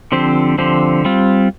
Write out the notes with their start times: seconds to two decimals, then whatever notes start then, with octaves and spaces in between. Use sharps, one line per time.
0.12 D3 F3 C4 G4 C5
0.58 D3 F3 C4 G4 C5
1.05 G3 C4 F4